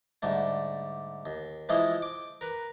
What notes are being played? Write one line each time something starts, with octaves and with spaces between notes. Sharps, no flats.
G#2 D3 G3 A3
D#2
E3 F3 G#3 E4 C5 D#5
D6
A#4 B4